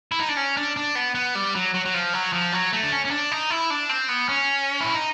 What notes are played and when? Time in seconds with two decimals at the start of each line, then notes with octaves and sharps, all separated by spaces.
0.12 E4
0.20 D#4
0.29 D4
0.37 C#4
0.57 D4
0.76 D4
0.95 B3
1.15 B3
1.35 G3
1.55 F#3
1.74 F#3
1.85 F#3
1.94 F3
2.14 F#3
2.33 F3
2.52 F#3
2.73 A3
2.83 D4
2.92 C#4
3.05 C#4
3.11 D4
3.31 D#4
3.50 E4
3.70 D4
3.89 C4
4.09 B3
4.29 C#4
4.81 E4
4.94 D#4